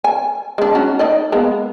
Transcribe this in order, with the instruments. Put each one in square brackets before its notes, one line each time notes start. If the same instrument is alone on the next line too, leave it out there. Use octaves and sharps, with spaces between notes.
[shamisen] G#5
G#3 D4
C#4 D#4 F#4
D#4 D5 D#5
G#3 A#3 B3